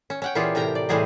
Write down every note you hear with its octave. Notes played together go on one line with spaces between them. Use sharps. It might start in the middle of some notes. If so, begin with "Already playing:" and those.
C#4
C#4 F#5 G5
A#2 E3 C#4 F4 G4 G#4
A2 C3 A#4 G5 A#5
D5
A2 E3 G3 G#4 C5 D#5